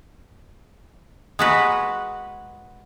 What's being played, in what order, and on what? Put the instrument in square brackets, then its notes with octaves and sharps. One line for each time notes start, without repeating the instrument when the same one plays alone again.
[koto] G#3 F#4 B4